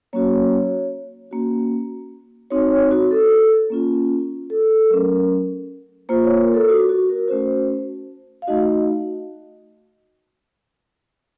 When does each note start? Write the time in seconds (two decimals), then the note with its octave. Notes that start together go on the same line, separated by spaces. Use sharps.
0.13 F#3 A#3 C#4 F#4 C#5
1.31 A#3 C#4 F#4
2.51 C4 D#4 F#4 C#5
2.71 C#5
2.91 F#4
3.11 A4
3.70 A#3 C#4 F4
4.50 A4
4.70 A4
4.89 F#3 A3 C#4 A#4
6.09 A#3 F4 C5
6.24 C#5
6.39 A#4
6.54 A4
6.69 F#4
6.89 F#4
7.09 A#4
7.28 A3 C#4 F#4 C5
8.42 F5
8.48 A3 D#4 F#4 D#5